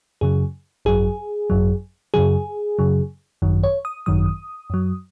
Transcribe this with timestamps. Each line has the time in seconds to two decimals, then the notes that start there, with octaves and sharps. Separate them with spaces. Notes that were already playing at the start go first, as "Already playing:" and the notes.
0.21 F#2 C#3 F#3 G#4
0.85 G#1 F#2 F#3 G#4
1.50 G#1 F#2 F#3
2.14 F#2 C#3 F#3 G#4
2.79 F#2 C#3 F#3
3.42 G#1 F#2 D#3 F#3
3.63 C#5
3.85 D#6
4.06 G#1 F#2 D#3 F#3 D#6
4.70 F#2 F#3